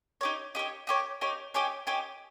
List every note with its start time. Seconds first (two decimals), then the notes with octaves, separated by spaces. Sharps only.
0.21 D#4 G4 C#5
0.55 D#4 G4 C#5
0.87 D#4 G4 C#5
1.21 D#4 G4 C#5
1.54 D#4 G4 C#5 G#5
1.87 D#4 G4 C#5 G#5